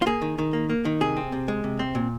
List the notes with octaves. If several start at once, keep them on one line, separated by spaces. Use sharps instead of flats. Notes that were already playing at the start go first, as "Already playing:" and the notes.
F4
A#3 G#4
D#3
D#3
A#3
A#3
D#3
C3 G#4
C4
C3
G#3
C3
C4
A#2